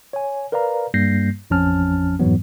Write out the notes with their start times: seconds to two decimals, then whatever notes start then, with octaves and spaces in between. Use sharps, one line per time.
0.13 C#5 G#5
0.52 A#4 B4 D5 F5 A#5
0.94 G2 G3 A#3 G6 A#6 C7
1.50 A1 F2 F3 C#4 A5 F6
2.19 F2 G#2 E3 F#3 B3